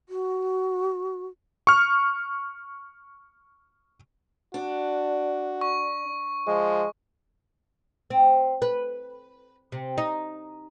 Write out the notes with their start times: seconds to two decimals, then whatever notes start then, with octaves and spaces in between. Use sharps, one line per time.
0.09 F#4
1.67 C#6 F6
4.54 D4 F#4
5.61 C#6
6.47 F3 G#3
8.10 C4
8.62 B4
9.72 C3
9.98 D#4